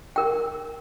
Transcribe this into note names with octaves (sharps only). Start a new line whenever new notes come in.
A#4 G5